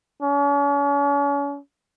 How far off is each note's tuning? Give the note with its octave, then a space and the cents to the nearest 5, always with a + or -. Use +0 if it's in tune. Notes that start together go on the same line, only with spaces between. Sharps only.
C#4 +40